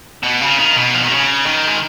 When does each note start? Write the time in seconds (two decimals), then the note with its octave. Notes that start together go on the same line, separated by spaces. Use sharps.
0.23 B2
0.41 C#3
0.58 D#3
0.76 B2
0.94 F3
1.03 D#3
1.12 C#3
1.46 D#3
1.67 G#3